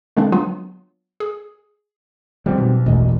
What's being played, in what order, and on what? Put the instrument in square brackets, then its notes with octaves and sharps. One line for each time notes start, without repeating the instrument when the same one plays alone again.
[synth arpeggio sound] D3 G#3 A#3 C4 D4
F#3 B3 D4 F4
G#4
[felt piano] F2 [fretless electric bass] G3 B3 C4
[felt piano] B1
[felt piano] E1 D#5 [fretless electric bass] A1 E2